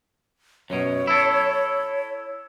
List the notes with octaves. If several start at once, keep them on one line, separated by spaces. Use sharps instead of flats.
F#2 B2 C#5
E4 A4